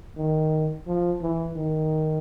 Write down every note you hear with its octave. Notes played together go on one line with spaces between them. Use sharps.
D#3
F3
E3
D#3